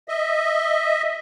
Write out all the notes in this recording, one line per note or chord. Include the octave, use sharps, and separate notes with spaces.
D#5 E5